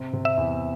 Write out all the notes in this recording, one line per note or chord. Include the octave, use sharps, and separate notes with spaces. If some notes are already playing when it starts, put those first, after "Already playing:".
Already playing: C3
C3
E5
E2